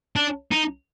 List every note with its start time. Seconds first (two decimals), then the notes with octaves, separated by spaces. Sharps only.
0.16 D4
0.51 D#4